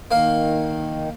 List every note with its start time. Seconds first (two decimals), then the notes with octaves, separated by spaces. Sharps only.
0.11 D#3 A#3 F5